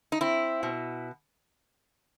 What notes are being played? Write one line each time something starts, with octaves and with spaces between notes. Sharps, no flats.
D#4
C4 E4
B2